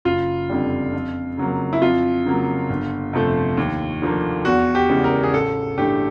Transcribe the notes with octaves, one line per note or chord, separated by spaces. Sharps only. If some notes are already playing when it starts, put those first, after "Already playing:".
F#1 F4
F2 D3 G3
F2
C#3 F#3 A#3
E4
F2 F4
C#3 F#3 A#3
G1
F2 C3 F3 A3
D#2
D3 F3 A#3
E2 F#4
G4
C#3 E3 G#3
A#4
G#4
A1 A4
G2 E3 A3 G4